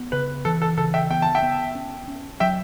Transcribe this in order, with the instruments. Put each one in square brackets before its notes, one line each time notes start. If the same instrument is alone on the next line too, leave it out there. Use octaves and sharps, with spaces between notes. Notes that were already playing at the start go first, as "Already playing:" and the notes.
Already playing: [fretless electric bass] B3
[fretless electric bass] C#3 [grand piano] B4
[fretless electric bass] E3 [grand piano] A4
[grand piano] A4
[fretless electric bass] C#3 [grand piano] A4
[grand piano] E5 G5
[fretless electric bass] B3 [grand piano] G5
[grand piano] A5
E5 G5
[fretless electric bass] B3
C#4
C#4
[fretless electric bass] F#3 [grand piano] E5 G5